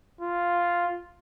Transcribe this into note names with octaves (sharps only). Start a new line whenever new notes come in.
F4